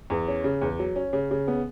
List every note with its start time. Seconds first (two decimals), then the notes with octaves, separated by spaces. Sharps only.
0.10 E2
0.28 C#4
0.44 C#3
0.62 E2
0.79 F#3
0.96 C#4
1.13 C#3
1.31 C#3
1.48 B3